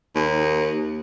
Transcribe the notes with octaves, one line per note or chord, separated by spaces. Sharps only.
D#2